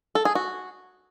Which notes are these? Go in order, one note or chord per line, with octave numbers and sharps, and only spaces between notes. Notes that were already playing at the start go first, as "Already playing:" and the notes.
A4
G#4
F#4